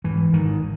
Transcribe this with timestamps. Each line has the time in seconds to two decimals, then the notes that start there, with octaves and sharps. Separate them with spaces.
0.04 G#2 E3
0.33 G#2 D#3